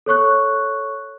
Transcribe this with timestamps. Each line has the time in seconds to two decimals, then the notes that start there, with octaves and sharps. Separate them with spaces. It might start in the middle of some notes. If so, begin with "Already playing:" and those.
0.06 A4 C#5 C#6 F#6